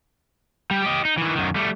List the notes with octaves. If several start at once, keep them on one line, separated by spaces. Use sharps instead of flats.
G3
G4 D#5
D#4
D#3 E3
F#2 D#3
G3 A3